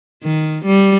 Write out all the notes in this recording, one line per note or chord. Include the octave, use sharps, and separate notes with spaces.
D#3
G3